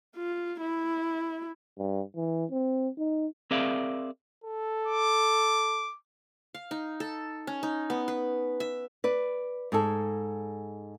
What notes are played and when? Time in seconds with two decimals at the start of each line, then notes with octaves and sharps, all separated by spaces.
0.16 F4
0.61 E4
1.78 G2
2.16 E3
2.51 C4
2.98 D#4
3.51 C4 G#4 A#4 D5 E5 F5
4.44 A4
4.87 D6
6.54 F5
6.71 D#4
7.00 A4
7.47 C#4
7.63 D#4
7.90 B3
8.08 B4
8.60 E5
9.04 B4 D5
9.72 G#2 G#4 A4